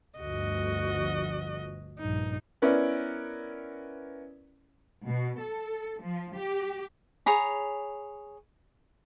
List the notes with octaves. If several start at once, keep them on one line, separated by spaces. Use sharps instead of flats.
G1 D2 F3 F#4 D#5
A#1 G2 D#4
B3 C#4 E4 A#4 B4 D5
B2
A4
F3
G4
G#4 C#5 A#5 B5